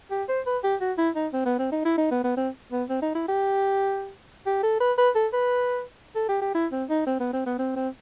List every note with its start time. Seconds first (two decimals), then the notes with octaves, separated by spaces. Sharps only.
0.11 G4
0.28 C5
0.46 B4
0.63 G4
0.80 F#4
0.98 E4
1.15 D#4
1.33 C4
1.45 B3
1.59 C4
1.72 D#4
1.85 E4
1.98 D#4
2.11 B3
2.24 B3
2.37 C4
2.72 B3
2.89 C4
3.02 D#4
3.15 E4
3.28 G4
4.46 G4
4.63 A4
4.80 B4
4.98 B4
5.15 A4
5.33 B4
6.15 A4
6.29 G4
6.41 G4
6.55 E4
6.72 C4
6.89 D#4
7.07 C4
7.20 B3
7.33 C4
7.46 B3
7.59 C4
7.76 C4